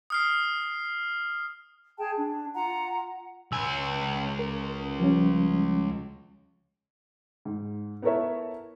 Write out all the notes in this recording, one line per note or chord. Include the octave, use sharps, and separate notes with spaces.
D#6 F6 C7
G#4 G5 A5
D4
F4 F#5 A#5
C#2 G#5 E6
A#4
F3 G3 C#4
G#2
B3 E4 A4 A#4 C#5 E5